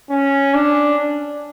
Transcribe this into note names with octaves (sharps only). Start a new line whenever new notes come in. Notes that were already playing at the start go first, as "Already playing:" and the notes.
C#4
D4